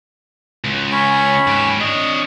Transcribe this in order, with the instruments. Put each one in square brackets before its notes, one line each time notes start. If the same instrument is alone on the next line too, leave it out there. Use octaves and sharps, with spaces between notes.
[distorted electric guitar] C#2
[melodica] C#4 C#5 B5
[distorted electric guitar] G#2 G4
[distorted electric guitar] D4 C#5 [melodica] D#5